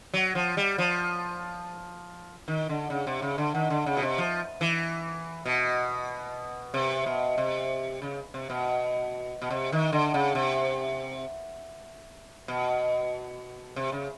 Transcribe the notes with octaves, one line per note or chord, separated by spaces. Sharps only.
F#3
F3
G3
F3
D#3
D3
C#3
C3
C#3
D3
D#3
D3
C#3
B2
C3
F3
E3
B2
C3
B2
C3
C#3
C3
B2
B2
C3
D#3
D3
C#3
C3
B2
C3
C#3